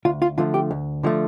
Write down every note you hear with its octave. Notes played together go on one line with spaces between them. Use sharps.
D2 F4
F4
D3 F3 A3 F4
G4
D2
D3 F3 A3